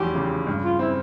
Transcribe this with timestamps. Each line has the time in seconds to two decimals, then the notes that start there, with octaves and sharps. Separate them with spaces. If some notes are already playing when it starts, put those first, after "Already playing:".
Already playing: F1 E2 F#3 G4
0.15 C#3
0.47 G2
0.63 F4
0.79 C4 E4